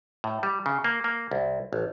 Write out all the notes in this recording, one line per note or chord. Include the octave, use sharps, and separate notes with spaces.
A2
G3
C#3
A#3
A#3
C2
A1